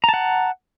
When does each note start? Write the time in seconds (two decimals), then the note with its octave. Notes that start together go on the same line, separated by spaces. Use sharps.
0.04 A#5
0.09 A5
0.14 F#5